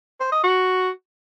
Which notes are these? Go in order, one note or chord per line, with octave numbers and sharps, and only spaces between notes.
C5
D#5
F#4